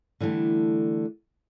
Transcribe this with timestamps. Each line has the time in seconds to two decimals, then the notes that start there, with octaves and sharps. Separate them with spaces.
0.20 D3 E3 G3 A3